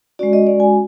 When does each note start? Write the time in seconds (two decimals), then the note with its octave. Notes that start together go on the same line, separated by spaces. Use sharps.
0.19 G#3 C#4 F#4 D5
0.33 D#5
0.47 D5
0.60 G#5